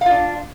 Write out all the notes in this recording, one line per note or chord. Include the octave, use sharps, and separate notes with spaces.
D4 F4 F5